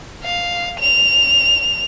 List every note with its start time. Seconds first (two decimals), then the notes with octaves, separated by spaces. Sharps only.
0.24 F5
0.79 F7